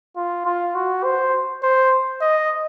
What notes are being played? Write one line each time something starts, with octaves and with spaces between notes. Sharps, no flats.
F4
F4
F#4
C5
C5
D#5